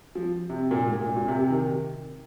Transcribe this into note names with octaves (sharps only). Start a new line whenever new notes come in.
F3
C3
A#2
G#2
A#2
A#2
C3
C3
D#3